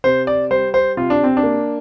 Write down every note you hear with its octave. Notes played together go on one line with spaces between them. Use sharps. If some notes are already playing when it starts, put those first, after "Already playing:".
C3 C5
D5
G3 C5
C5
C3 F4
D4
C4
D4
A#3